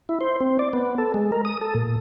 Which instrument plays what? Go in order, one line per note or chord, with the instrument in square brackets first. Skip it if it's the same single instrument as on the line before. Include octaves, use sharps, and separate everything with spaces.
[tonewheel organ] E4
C5
C4
D5
B3
A4
G#3
A#4
D#6
A4
A#2